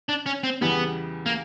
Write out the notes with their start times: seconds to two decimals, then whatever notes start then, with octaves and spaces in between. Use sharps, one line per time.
0.09 D4
0.26 C#4
0.44 C4
0.61 E2 C#3 E3 G3 B3
1.26 A#3